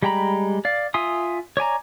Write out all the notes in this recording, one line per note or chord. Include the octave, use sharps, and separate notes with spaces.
G3 G#3 G5 A#5 B5
D5 F5
F4 E5 G#5 C6 D#6
C#5 D5 G#5 A#5